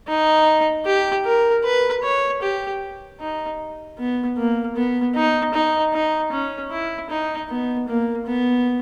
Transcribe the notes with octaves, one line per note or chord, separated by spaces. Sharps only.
D#4
G4
A#4
B4
C#5
G4
D#4
B3
A#3
B3
D#4
D#4
D#4
C#4
E4
D#4
B3
A#3
B3